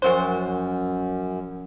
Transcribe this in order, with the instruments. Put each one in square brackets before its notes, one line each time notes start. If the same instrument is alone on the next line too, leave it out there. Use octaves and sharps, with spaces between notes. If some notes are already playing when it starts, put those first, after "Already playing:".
[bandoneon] F#2 [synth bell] F3 C#4 C#5 [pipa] F#4 C5